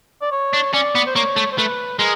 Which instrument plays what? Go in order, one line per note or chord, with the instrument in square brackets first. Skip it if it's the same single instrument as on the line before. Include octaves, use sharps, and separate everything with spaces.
[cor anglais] D5
C#5
[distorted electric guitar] D4
[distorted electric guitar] C#4 [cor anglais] D5
[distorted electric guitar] B3
[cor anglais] C5
[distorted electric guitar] A#3 [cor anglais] C#5
[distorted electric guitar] A3
[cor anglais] C5
[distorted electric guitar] A3 [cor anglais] B4
[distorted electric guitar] G#3 [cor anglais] A#4